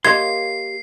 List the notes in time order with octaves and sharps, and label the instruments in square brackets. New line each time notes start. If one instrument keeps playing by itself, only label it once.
[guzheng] A#3 C#5 [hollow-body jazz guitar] G4 D#5 C6 [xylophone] G#6 [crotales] C7